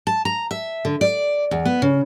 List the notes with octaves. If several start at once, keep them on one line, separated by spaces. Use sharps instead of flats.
A5
A#5
E5
D3
D5
E2
B3
C#3